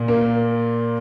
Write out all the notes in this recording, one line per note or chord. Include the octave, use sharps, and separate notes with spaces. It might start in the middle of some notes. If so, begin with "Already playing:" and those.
Already playing: A#2
A#3